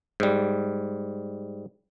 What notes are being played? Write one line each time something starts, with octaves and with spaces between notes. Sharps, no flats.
G#2 G3